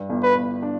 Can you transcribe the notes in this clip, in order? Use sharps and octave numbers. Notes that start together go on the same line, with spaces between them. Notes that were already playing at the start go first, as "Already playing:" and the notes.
Already playing: G2
G1
B4
G1
D4